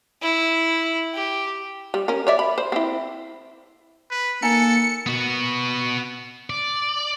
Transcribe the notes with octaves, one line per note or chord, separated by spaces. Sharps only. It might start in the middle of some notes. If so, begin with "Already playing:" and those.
E4
G4
G3
C#4 A#4
C#5 D5 E5
B5
C5
C4 E4
B4
A#3 D#4 A4 G#5 A#5 C#7
B3 F#4
D5